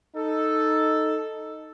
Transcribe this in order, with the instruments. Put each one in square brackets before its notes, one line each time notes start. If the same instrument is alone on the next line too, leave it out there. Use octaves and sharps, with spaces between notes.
[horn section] D#4 A4